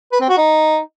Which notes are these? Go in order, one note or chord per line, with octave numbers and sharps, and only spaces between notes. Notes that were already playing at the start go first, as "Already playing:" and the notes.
B4
C4
F#4
D#4